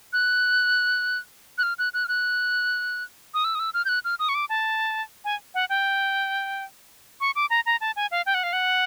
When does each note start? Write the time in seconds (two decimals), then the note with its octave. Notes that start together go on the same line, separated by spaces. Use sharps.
0.13 F#6
1.58 F#6
1.63 F6
1.79 F#6
1.94 F#6
2.04 F6
2.08 F#6
3.34 D#6
3.45 E6
3.55 D#6
3.60 E6
3.74 F6
3.85 G6
3.89 F#6
4.05 F6
4.19 D#6
4.29 C#6
4.35 D6
4.49 A5
5.25 G#5
5.54 F#5
5.69 G5
7.21 C#6
7.35 D6
7.50 A#5
7.66 A#5
7.81 A5
7.96 G#5
8.11 F5
8.26 G5
8.34 F#5
8.43 F5
8.53 F#5